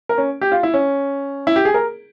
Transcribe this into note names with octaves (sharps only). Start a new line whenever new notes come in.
A#4
C#4
G4
F4
E4
C#4
E4
G4
G#4
A#4